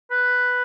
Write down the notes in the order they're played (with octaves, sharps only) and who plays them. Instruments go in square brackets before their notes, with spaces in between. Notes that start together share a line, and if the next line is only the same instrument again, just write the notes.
[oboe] B4